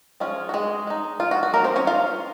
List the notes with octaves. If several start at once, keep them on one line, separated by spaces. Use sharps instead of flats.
F3 G#3 C#4 F4
F#4
G#3 G#4
G#3 D#4
F4
F#4
F#4
F#3 A#3 D#4 A#4
C4 C5
C#4 C#5
F4 F5